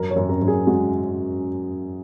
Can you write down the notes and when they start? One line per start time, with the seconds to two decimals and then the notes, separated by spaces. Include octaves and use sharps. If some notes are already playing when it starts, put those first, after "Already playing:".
Already playing: F#2 A#4
0.10 C#5
0.16 F#2
0.29 A#4
0.42 F#2
0.48 G#4
0.67 G#3 F#4